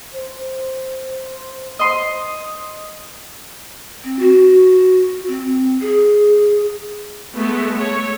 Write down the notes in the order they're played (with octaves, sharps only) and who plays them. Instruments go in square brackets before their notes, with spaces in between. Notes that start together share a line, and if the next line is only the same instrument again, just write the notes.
[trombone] C5
[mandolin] D#5 C6
[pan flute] C4
F#4
C4
G#4
[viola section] G#3 A3 B3
A3 C#5